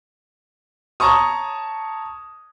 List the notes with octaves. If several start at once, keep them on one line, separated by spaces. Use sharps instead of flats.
C#5 A5 A#5 C#6 D#6